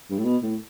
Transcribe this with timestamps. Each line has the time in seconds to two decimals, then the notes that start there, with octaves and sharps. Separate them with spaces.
0.10 G2
0.18 A2
0.25 B2
0.43 A2